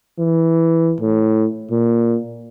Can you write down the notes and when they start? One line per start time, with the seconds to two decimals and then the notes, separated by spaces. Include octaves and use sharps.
0.19 E3
1.00 A2
1.71 A#2